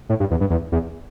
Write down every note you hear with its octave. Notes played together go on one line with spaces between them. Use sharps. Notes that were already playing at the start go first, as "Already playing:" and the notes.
A2
G2
E2
G2
E2
E2